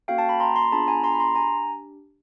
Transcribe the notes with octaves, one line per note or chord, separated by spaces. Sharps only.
A#3 C#4 F#4 A4 F5 G5
G5 A5
A5 B5
A#5 C6
A#5 C6
B3 D4 F4 G#4 A5 B5
G#5 A#5
A#5 C6
B5
A#5 C6
D4 G4 G#5 A#5